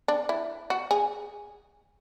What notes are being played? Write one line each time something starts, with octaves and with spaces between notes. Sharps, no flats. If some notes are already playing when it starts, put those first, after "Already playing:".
D4
E4
F#4
G#4